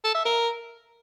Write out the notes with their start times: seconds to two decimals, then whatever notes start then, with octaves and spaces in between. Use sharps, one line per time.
0.04 A4
0.15 E5
0.25 A#4